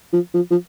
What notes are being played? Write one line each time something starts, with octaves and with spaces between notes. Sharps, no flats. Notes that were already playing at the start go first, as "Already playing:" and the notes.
F3
F3
F3